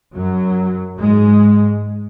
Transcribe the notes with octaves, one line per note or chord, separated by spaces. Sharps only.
F#2 F#3
G#2 G#3